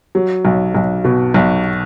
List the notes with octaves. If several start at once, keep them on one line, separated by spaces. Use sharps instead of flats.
F#3
B1
B1
B2
B1